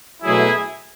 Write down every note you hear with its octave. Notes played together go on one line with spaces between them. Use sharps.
B2 F#3 A3 E4 G#4